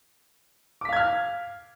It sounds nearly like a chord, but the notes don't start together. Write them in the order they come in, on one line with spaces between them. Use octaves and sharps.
D6 B6 F5 G#6 F6